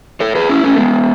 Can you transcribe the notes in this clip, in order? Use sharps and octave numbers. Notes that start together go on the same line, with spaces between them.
A4 C#5
G#4 B4
C#4 E4
A3 C#4
G#3 B3